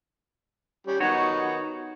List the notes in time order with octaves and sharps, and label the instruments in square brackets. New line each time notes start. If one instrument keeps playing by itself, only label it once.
[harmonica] G3 C#4
[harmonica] D#3 B3 D#4 [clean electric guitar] F#4 C#5